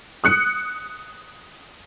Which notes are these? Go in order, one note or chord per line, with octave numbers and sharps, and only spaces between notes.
D#6 F#6 C#7